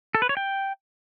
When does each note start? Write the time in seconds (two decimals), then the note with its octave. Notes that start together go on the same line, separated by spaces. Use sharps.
0.15 A4
0.22 B4
0.29 C#5
0.37 G5